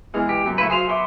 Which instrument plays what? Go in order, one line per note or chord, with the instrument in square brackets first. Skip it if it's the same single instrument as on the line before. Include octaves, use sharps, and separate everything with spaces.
[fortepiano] E3 G#3 F6 [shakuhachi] B3
[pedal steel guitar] G4
[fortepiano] F#2
[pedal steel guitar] A3 E4 B4 [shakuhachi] F5
[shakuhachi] F#4 [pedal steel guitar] G#4 C5 F5
[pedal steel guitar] B3 C6 D6 [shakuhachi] E5